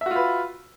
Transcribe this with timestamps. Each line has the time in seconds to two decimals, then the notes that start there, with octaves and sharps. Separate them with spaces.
0.01 E5
0.06 F#4
0.11 F4
0.16 B4